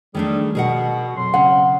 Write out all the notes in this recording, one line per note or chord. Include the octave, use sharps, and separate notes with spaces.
D#3 G3 A3 D4 G#4
B2 G#4 A#4 F#5
F2 F#3 C6
C#3 F#5